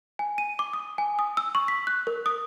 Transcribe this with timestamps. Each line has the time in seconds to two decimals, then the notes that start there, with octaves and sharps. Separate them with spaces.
0.19 G#5
0.38 D#7
0.59 D6
0.73 D#6
0.98 G#5
1.19 D#6
1.37 E6
1.55 C#6
1.68 B6
1.87 F#6
2.07 A#4
2.26 D#6